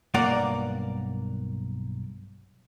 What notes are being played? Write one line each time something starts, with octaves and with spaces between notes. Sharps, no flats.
B1 G2 A#3 A#4 D5 F#5